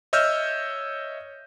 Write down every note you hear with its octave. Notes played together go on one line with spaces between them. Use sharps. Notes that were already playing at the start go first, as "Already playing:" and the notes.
C#5 D#5 E5 E6 F6 G6